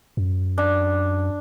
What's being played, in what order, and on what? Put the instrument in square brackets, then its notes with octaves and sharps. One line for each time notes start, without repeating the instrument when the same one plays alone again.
[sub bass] F#2
[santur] D4